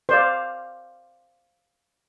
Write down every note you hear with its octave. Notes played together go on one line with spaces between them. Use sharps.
C5 D5 F5